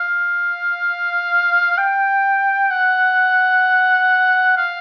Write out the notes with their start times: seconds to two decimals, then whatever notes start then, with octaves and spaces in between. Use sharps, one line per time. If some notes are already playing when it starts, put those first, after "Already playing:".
Already playing: F5
1.78 G5
2.71 F#5
4.57 F5